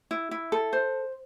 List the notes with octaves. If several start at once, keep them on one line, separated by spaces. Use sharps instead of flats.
E4
E4
A4
C5